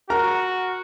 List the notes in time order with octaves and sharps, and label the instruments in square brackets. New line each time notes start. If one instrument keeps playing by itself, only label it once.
[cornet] F#4 [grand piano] A#4 A#5